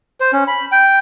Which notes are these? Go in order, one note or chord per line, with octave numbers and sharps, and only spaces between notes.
C5
C#4
B5
G5